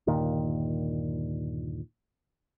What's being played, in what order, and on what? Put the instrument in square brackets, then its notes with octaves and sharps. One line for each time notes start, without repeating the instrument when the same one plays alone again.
[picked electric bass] G1 D#2 A#2 D#3